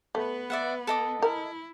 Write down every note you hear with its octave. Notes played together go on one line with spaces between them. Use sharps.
A3 B3 B4
D5 E5 F#5
A4 D#5 D6
E4 A#4